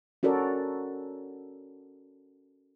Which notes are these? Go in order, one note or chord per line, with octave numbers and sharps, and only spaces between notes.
C#4 F#4 A4 A#4 D5